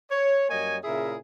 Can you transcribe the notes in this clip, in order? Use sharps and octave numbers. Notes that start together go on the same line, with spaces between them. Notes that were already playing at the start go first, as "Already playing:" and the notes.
C#5
F#2 G3 A#3 C#5 D#5 G#5
A#2 C#3 E4 G#4 A#4 E5